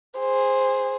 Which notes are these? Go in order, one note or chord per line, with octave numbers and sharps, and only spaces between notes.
G#4 C5